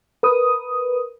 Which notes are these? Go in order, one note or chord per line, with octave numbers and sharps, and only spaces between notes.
A#4 B4 D#6